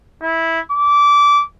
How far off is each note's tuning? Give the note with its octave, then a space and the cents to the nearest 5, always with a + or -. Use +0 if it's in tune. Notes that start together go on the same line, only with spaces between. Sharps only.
E4 -10
D6 -20